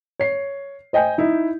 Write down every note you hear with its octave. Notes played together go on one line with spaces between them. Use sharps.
C#5 C7
C5 D#5 G5 G#5 G6
D#4 E4